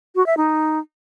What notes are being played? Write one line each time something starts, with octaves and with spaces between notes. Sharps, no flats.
F#4
E5
D#4